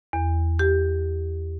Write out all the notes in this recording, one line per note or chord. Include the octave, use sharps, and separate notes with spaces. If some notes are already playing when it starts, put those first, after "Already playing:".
E2
G4